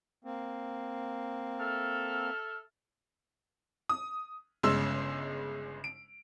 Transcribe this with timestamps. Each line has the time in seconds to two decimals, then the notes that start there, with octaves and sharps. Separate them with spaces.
0.24 A#3 C4
1.60 A4 E5 F6
3.89 D#6
4.63 G1 C#3 G#3 C6 E6
5.84 D7